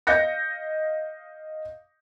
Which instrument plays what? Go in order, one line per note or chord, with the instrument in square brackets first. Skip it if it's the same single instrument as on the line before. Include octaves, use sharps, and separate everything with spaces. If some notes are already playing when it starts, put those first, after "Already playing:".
[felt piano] D#5 F5 G6 A#6 C#7